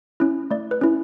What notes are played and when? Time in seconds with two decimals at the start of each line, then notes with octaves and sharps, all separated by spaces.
0.20 C#4 E4
0.51 A3 D5
0.71 B4
0.81 C#4 E4